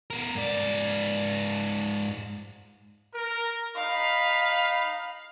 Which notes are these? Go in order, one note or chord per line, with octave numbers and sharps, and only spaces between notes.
B3 A#4
G#2 D5
A#4
D#4 F5 B5